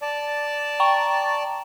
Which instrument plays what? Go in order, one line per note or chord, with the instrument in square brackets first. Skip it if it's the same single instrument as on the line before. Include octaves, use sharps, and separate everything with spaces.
[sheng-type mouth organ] D5 A5
[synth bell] G5 A#5 C#6